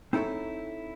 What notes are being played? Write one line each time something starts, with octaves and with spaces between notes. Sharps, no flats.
C4 D#4 E4 A4 C#5